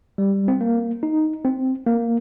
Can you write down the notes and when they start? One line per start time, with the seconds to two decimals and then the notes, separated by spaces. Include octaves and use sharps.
0.18 G3
0.48 C4
0.61 A#3
1.03 D#4
1.45 C4
1.87 A#3